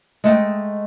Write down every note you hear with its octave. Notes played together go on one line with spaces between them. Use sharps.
G#3 A3 D#5 G5